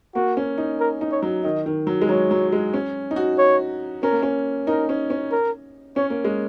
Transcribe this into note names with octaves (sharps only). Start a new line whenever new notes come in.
A#3 F#4
C#4
D#4
A#4
D#4
C#5
F#3
D#3 D#5
D#3
F#3
G#3
F#3 C#5
F#3
G#3
C#4
D#4
F#4
C#5
C#4 A#4
A#3
C#4
D#4 A#4
C#4
C#4
A#4
C#4 C#5
A#3
G#3